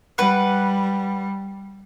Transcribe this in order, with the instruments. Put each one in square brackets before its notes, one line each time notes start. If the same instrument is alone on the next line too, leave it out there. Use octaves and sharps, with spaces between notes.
[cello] G3 [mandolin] B4 F#5